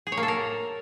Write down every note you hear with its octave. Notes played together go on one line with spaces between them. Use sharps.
G#4
C#5
A#3
A4
A#4